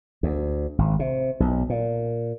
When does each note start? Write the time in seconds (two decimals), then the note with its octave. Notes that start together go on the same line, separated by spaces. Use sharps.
0.23 D2
0.78 G#1
0.99 C3
1.40 B1
1.70 A#2